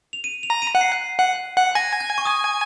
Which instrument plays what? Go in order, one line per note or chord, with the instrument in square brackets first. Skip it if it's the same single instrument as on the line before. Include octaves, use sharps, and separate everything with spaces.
[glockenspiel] F7
D#7
F7
[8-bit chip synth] A#5
[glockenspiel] D#7
[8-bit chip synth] F#5
[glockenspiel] C7
[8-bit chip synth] F#5
F#5
[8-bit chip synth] G#5 [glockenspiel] A#6
[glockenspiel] G#6
C#6
D#6